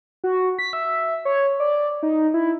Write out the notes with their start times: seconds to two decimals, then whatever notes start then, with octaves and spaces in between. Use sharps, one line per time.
0.24 F#4
0.59 B6
0.73 E5
1.25 C#5
1.60 D5
2.03 D#4
2.34 E4